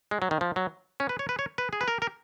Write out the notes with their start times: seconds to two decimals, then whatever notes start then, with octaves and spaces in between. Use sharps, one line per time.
0.11 G#3
0.22 F#3
0.31 D#3
0.41 F3
0.56 F#3
1.00 C#4
1.09 B4
1.19 C#5
1.29 B4
1.39 C#5
1.58 B4
1.73 G#4
1.81 B4
1.88 A#4
2.02 A#4